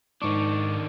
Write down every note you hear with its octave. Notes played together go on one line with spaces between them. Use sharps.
G#2 D#3 D4 C#6 D6